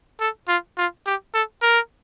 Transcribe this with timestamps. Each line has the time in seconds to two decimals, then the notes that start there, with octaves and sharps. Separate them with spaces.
0.20 A4
0.48 F4
0.77 F4
1.06 G4
1.34 A4
1.62 A#4